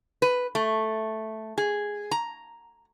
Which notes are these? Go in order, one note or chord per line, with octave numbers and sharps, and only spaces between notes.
B4
A3
G#4
A#5